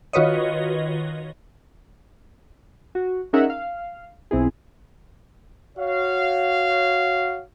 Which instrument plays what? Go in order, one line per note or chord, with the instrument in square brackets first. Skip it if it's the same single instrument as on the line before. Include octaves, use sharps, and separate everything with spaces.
[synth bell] D#3 F4 F#4 B4 C#5 D#5
[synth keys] F#4
C#4 D#4 G#4 A#4 E5 F#5
F5
B1 C4 E4 G#4
[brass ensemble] F#4 C#5 F5